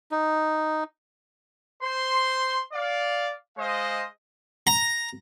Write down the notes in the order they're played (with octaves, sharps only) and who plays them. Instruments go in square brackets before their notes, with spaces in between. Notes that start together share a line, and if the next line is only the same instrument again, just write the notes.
[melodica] D#4
[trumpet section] C5 C6
D5 F5
G#3 C5 D#5 F5
[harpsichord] A#5